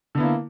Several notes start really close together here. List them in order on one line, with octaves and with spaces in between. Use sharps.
D3 B3 E4 A#3